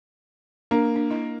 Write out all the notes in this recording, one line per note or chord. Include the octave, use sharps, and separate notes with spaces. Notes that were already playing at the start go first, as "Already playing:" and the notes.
A#3 D4
D4
E4 D#5